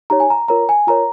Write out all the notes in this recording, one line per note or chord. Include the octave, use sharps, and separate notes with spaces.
D#4 G4 C#5 A#5
G#5
A#5
F4 A#4 C#5 A#5
G#5
F4 A#4 C#5 A#5